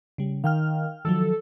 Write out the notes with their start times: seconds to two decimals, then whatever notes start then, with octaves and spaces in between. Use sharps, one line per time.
0.18 C#3 G3
0.44 D#3 F5 G5 F6
1.05 D#3 F3 F#3 A4